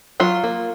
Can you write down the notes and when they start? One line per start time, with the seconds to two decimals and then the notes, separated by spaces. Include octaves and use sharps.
0.20 F#3 F4
0.44 A#3